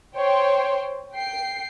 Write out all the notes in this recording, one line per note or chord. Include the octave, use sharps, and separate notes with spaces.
C5 C#5 G5 C6
G5 C7